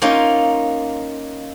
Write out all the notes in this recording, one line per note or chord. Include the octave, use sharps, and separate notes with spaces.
A#3 C#4 D#4 F4